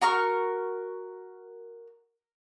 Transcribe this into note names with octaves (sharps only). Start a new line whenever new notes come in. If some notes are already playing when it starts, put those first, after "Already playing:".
F#4 A#4 C#6 F6